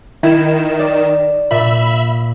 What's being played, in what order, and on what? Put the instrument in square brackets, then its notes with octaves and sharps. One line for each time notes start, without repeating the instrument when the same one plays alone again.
[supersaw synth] D#3 E7 [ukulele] E4
[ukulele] D5
[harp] A#2 [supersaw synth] E5 B5